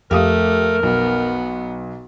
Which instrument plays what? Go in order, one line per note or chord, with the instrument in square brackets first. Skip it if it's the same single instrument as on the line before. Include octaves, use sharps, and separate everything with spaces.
[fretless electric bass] F2 [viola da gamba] A3 [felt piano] G4 F5 D#6 [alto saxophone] A#4
[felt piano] B1 [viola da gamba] B3